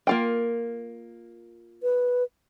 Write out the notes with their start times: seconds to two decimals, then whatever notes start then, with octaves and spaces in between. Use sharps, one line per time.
0.07 A#3 F4 G5
1.83 B4